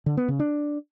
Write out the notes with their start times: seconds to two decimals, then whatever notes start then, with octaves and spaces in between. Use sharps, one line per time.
0.06 D3
0.17 B3
0.28 C#3
0.39 D4